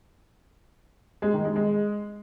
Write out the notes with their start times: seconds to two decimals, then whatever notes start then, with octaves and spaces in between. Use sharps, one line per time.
1.22 G#3
1.33 D#3
1.44 G#3
1.56 G#3